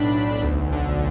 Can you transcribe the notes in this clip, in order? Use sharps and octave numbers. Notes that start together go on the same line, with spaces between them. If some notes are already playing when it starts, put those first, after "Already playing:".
Already playing: B1 A2 D4 B5
B1
D2
D3